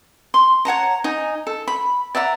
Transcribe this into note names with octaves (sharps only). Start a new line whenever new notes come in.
C6
C#5 F#5 A5 A#5
D#4 G#5
A4
B5
D5 E5 F#5 A#5